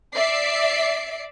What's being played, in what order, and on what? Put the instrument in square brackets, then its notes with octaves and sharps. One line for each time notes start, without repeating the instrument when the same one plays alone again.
[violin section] D5 E5 C7 D7